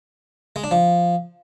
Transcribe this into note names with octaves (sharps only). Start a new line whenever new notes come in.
G#3
D4
F3